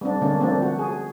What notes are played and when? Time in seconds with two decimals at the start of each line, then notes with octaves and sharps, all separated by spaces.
0.01 G3 C4 D4
0.22 D3 G3 G#3 A#3 C#4 D4
0.40 F3 G3 A3 A#3 C4 D4
0.62 F#4
0.79 G#4